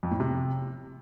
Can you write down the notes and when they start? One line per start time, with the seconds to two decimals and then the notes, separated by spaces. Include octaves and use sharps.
0.03 F2
0.11 A2
0.20 C3